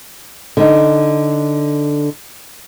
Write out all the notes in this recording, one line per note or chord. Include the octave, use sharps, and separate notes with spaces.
D3 D#4